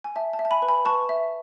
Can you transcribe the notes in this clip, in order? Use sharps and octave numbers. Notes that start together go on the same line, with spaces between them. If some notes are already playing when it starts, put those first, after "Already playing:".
G#5
E5 A5
A5
E5
A5
G#5 B5
B4
G#5 B5
B4 A5 C#6
E5